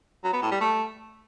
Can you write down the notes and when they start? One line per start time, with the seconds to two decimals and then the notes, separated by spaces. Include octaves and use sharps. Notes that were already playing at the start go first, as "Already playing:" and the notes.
0.24 F#3
0.33 B3
0.42 A2
0.51 G3
0.61 A3